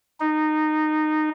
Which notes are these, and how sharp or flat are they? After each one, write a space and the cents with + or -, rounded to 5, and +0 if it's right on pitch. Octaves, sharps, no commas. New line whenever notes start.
D#4 -15